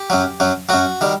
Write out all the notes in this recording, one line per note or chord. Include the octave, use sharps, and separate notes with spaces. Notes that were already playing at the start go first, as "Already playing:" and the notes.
Already playing: G4
F#2 F#3
F#2 F#3
F#2 F#3 F#4
D#3 G3